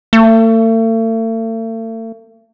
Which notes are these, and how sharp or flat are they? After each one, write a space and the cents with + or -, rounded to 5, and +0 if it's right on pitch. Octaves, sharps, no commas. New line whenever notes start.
A3 +40